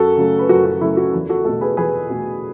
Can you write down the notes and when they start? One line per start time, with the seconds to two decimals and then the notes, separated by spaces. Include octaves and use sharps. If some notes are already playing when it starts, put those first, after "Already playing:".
Already playing: F#2 F#4 A4
0.17 C#3 F#3 A3
0.39 B4
0.49 F#2 F#4 A4
0.65 F#4
0.81 C#3 F#3 A3 E4
0.97 F#4
1.14 E2
1.29 F#4 A4
1.45 B2 A3 F#4 A4
1.61 G#4 B4
1.77 E2 G#4 B4
2.10 B2 A3 F#4